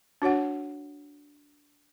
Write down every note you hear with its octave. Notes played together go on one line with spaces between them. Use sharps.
D4 F#4 C#5 F#5